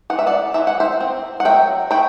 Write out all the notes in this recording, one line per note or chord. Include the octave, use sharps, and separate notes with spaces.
E3 F#5
E5
D5 F#5
E3 E5
F#5
C5 E5
C4
F#5
F#3 E5 G5
A3 G5 B5